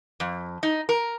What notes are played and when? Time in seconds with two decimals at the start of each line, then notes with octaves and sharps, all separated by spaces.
0.20 F2
0.63 D#4
0.89 A#4